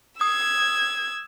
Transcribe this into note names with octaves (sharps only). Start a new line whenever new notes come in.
D#6 E6 G#6